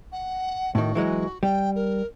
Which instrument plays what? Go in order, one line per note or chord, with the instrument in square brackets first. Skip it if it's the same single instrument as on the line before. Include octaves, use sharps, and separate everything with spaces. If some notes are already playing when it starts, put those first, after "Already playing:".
[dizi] F#5
[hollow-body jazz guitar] A2 D#3 [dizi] F#4
[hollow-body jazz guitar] E3 F#3 G#3
[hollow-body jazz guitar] G3 [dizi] G5
[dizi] A#4